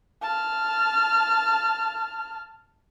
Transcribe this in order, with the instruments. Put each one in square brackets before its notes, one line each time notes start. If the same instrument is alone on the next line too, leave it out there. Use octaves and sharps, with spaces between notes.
[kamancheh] A5 F6